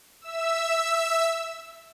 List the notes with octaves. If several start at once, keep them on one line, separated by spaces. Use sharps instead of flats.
E5 E6